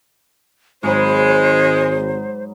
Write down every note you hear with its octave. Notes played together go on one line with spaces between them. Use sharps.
G#1 G#2 F#3 G#3 C5 B5